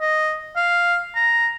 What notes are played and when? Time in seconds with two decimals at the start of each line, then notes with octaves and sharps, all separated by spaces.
0.01 D#5
0.56 F5
1.16 A#5